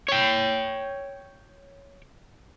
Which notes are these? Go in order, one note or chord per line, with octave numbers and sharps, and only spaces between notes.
C#5 G5